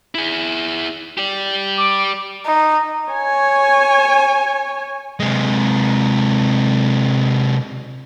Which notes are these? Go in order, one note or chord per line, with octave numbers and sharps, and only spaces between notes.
E4 G#4
G4 D5
D6
D#4
C#5 G#5
C3 G#3